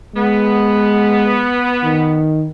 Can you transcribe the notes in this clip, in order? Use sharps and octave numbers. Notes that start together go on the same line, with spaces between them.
G#3 B3
D#3